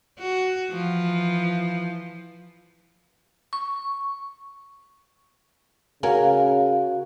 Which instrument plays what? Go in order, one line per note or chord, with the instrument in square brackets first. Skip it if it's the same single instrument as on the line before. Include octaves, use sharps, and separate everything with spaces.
[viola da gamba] F#4
E3 F3
[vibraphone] C#6
[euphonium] C#3 [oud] C#4 A#4 [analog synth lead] F#4 [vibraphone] F5